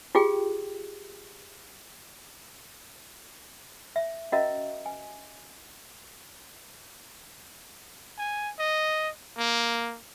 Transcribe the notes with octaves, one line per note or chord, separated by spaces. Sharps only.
F4 G4 G#4 G5
E5
C#4 F#4 A#4 D#5 E5 A#5
G#5
G#5
D#5
A#3